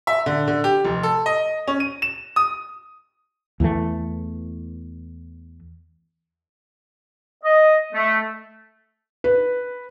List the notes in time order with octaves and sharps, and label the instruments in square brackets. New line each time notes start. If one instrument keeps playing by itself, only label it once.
[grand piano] E5
D3
D3
G4
F1
A4
D#5
C#4
D#7
E7
D#6
[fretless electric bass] E2 E3 F#3 A3
[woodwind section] D#5
A3
[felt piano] B4